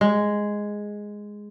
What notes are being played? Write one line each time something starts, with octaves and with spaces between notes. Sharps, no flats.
G#3